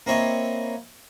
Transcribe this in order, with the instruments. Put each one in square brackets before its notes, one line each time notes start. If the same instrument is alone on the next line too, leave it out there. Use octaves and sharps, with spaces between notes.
[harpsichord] A#3 C4 E4 C#5 D#5